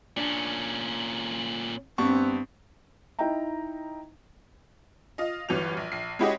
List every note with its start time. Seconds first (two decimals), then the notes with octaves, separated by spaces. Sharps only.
0.17 A#2 C#4 D4
1.98 G2 B3 C4 C#6
3.19 D#4 E4 D#5 E5 G5 A#5
5.18 F4 D#5
5.49 G1 G2 E3 F#3 F7
5.77 A#1
5.92 A#1 C7
6.19 G#3 C#4 E4 F#4 G4 D#5